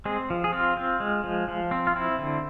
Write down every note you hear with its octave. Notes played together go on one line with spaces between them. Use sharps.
G#3 C4 G#4
F3
G#4
C4 F4
C4
G#3
F3
F3
C4
F4
C4 E4
D3